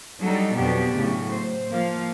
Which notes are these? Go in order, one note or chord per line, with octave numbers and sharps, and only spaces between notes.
F#3 G3 D4 D#4 A4
F2 B2 F#3 B3 D4 G4
A2 C#3 F#3
C5
F3 A#3 F5